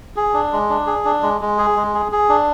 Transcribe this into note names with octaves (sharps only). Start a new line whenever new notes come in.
G#4
D4
G#3
D4
G#4
D4
G#3
G#3
G#4
G#3
G#4
G#4
D4